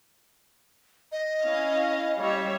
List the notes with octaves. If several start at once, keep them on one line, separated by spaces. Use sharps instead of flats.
D#5
C#4 E4 F5
G3 C#5 E5